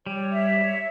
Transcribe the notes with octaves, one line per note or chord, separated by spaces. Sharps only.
G3 C#5
E5
C#5